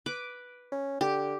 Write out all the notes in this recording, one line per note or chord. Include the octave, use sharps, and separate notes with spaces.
B4 D6
C#4
D3 G4